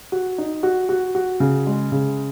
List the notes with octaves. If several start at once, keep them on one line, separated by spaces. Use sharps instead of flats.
F#4
D#4
F#4
F#4
F#4
C#3
G#3
C#3